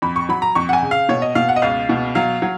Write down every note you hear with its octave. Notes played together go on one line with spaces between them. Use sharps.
F2 B5
C#6
F#3 B5
A#5
F2 C#6
F#5
G#5
C#3
F5
B2 C#5
D#5
B2 F5
F#5
D#5
C#2 F5
B2
F#3 F5
F#3